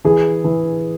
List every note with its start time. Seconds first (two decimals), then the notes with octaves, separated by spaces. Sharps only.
0.04 E3 G#4
0.44 E3